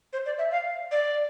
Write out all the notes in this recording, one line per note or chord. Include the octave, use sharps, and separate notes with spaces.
C5
D5
E5
F5
D5